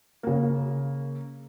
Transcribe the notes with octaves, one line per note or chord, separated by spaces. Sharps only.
C#3 A#3